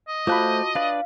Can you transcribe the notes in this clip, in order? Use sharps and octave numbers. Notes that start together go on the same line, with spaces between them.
D#5
A3 F4 F#4 C5 A5 B5 D6 F#6
D4 B4 D5 F5